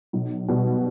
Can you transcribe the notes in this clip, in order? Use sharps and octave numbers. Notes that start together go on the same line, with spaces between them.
B1
B2 G3